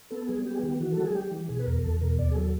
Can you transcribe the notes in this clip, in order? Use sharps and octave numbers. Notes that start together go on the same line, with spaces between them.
B3 A4
G3 G#4
B3 G4
G#4
D#3 G4
E3 F#4
A4
G3
G#4
G3 G4
E3
B2 G#4
B4
E2 A#4
E2 A4
B2 A#4
D#2 D5
G#4
F#3 A4